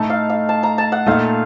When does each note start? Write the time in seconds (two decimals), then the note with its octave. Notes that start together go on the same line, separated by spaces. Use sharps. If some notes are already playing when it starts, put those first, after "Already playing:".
Already playing: A2 A3 D#4 A4 D#5 A5
0.10 F5
0.30 F5
0.49 A5
0.63 A#5
0.78 A5
0.92 F#5
1.07 A#2 A3 D#4 A4 F5